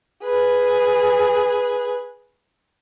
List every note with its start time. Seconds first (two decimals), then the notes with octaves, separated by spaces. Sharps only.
0.24 G#4 B4